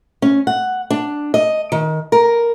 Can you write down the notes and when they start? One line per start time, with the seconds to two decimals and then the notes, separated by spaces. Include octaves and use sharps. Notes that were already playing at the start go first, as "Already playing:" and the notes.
0.22 C#4
0.47 F#5
0.90 D4
1.34 D#5
1.72 D#3
2.12 A#4